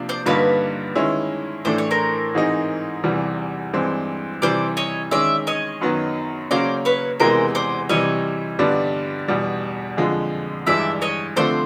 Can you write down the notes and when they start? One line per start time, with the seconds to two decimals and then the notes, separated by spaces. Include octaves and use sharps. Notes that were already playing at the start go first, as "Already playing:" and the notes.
Already playing: C3 F3 A#3 D4
0.09 C5 D5
0.26 G2 D3 G3 A#3 D#4 B4 C#5
0.95 D#3 G#3 C#4 E4
1.65 A2 E3 A3 D4 C5
1.78 C#5
1.91 A#4 C5
2.35 G#2 E3 G#3 C4 D#4
3.04 E2 C3 E3 G3
3.73 G2 E3 G#3 C4
4.42 C3 E3 G3 C5 D5
4.77 C#5 D#5
5.11 D#3 G#3 C#4 D5 E5
5.47 C#5 D#5
5.81 F#2 D#3 F#3 B3
6.51 C#3 F#3 A#3 C#4 C5 D5
6.85 B4 C#5
7.20 E2 C3 E3 G#3 B3 A#4 C5
7.55 C5 D5
7.89 C3 E3 G3 C#5 D#5
8.59 G2 D3 G3 B3 D4
9.28 E2 B2 G3
9.97 F2 D3 F3 G#3
10.67 G2 E3 G#3 D5 E5
11.02 C#5 D#5
11.36 D3 F3 A3 C4 C5 D5